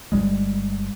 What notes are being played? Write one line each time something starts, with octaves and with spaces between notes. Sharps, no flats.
G1 G2 G3 G#3